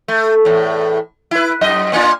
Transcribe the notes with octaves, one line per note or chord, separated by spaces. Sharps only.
A3
E2 A2
E4 B4
F#2 D#5
A#3 D4 F4